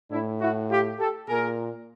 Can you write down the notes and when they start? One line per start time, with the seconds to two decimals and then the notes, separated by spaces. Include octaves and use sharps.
0.11 A2 D4 E4
0.40 E4 F#4
0.70 F4 G4
0.99 G4 A4
1.29 A#2 G#4 A#4